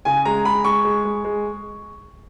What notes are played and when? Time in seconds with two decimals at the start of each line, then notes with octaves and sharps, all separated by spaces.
0.05 C#3 G#5
0.25 G#3 A#5
0.45 G#3 B5
0.64 G#3 C#6
0.85 G#3
1.05 G#3
1.25 G#3